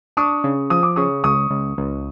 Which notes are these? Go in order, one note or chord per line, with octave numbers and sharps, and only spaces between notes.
D4 C#6 D#6
C#3
F3 D#6
D6
C#3 C#6 D#6
C#2 C#6 D#6
C#2
C#2